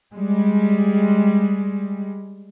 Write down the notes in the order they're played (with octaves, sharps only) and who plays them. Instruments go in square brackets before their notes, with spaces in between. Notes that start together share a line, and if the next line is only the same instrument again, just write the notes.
[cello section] G3 G#3